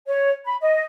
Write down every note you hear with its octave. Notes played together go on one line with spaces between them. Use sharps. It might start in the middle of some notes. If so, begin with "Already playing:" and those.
C#5
B5
D#5